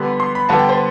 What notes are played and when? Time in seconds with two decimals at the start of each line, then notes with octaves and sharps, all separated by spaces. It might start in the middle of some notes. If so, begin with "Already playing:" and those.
Already playing: D3 G3 B3 C6
0.20 C6
0.35 B5
0.49 D3 G3 B3 A5
0.59 G5
0.69 C5